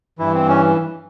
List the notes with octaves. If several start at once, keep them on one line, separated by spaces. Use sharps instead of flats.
G2 E3 E4
C4
C#4